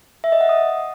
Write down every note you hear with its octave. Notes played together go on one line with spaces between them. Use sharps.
E5
D#5
F#5
D#6